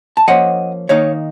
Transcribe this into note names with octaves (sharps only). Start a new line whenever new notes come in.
A5
F3 A#3 C#4 D#5 F#5
D#3 A#3 D#4 C#5 F5